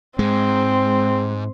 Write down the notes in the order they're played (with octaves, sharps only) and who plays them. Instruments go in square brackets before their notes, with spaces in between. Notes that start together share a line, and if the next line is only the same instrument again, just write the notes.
[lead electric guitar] G#2 [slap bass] G#3 [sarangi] C4